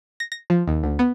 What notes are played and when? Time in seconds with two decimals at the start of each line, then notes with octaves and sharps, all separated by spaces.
0.20 A#6
0.32 A#6
0.50 F3
0.68 D#2
0.84 D2
0.99 B3